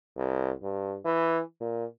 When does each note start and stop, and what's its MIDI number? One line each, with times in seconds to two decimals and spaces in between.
0.17 0.51 36
0.63 0.96 43
1.05 1.41 52
1.61 1.85 46